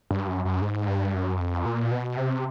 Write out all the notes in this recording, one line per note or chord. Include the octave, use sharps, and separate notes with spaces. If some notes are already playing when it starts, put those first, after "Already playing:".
G2
F#2
F#2
G#2
G2
F#2
F2
A#2
B2
C3